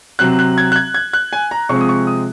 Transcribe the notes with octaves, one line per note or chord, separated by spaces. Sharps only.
C3 F#3 C4 F#6
F#6
G#6
F#6
G#6
G#6
F#6
G#5
A#5
C3 F3 G#3 C4 C#6
D#6
C#6
D#6